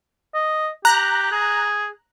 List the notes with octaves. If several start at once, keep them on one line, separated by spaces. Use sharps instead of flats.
D#5
G4 A#5 F#6
G#4